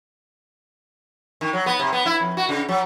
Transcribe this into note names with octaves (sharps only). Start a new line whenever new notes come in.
D#3
F#3
B3
C3
B3
E4
F2
F#4
C#3
F#3